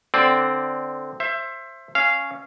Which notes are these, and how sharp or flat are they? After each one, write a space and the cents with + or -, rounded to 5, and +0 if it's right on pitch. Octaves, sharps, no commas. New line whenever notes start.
D3 +0 C4 +0 D5 +0
C5 +20 E5 +20
C#4 +0 F5 -15